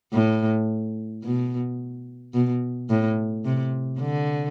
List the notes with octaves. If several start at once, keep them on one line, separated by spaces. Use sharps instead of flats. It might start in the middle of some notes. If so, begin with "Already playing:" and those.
A2
B2
B2
A2
C3
D3